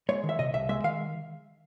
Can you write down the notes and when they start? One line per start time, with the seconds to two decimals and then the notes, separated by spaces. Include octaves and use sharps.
0.09 G#3 C#5
0.24 D#3
0.29 E5
0.39 C3 D#5
0.54 C2 E5
0.69 G#3 E5
0.84 D#3 F5